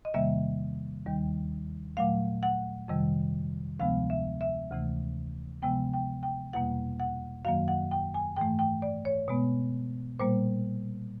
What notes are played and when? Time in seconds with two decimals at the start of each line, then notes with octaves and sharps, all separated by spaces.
0.05 D#5
0.14 E2 C3 D#3 G3 A#3 E5
1.06 D#2 D#3 G3
1.97 A#2 F#3 A3 F5
2.43 F#5
2.88 F2 C3 D#3 G3
3.79 D2 C3 F3 G#3 B3 F5
4.10 E5
4.41 E5
4.71 D2 C3 E3 A3
5.62 C3 F3 G#3 B3 G5
5.93 G5
6.23 G5
6.53 E2 B2 G3 A#3 F#5
7.00 F#5
7.45 F#2 D#3 F#3 A#3 F5
7.68 F#5
7.91 G5
8.14 G#5
8.36 G#2 E3 A3 G5
8.59 G5
8.82 D5
9.05 C#5
9.28 B2 G#3 B3
10.19 A#2 G3 A#3 C5